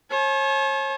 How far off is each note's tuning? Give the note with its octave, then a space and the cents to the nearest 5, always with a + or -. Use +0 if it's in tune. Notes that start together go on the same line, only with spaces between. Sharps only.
C#5 -40 A5 -45